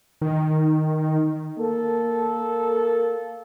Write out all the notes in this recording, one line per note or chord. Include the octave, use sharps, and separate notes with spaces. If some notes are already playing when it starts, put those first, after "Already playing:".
D#3
A#3 A4